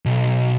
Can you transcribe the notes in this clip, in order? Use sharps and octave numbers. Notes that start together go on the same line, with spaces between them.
B1